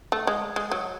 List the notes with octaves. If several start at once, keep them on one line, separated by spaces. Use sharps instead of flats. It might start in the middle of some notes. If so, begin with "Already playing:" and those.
A3
G#3
G#3
F#3